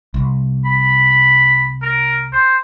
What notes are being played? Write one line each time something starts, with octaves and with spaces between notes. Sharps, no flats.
C2
B5
A#4
C5